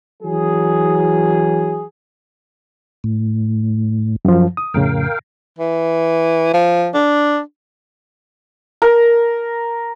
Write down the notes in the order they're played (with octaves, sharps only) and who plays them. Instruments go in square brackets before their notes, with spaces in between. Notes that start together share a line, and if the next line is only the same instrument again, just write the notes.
[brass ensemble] E3 F#3 G#4
[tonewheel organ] A2
[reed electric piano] F#2 F3
D#6
[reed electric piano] F2 A2 C#3 [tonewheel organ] A#4 F5 G5
[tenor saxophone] E3
F3
D4
[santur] A#4